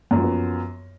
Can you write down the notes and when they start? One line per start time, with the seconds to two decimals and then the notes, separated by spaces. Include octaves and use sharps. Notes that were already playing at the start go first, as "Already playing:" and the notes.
0.11 F#2
0.15 F3
0.20 F#3
0.24 B3